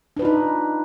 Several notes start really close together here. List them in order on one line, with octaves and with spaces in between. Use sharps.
D4 B4 F4 D#4